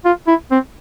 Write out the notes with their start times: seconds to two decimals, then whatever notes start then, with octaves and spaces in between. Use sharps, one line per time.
0.05 F4
0.27 E4
0.51 C4